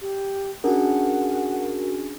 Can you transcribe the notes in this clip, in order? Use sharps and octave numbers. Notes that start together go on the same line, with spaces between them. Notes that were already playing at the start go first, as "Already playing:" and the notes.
G4
C#4 D4 F#4 G#4 A#4 F#5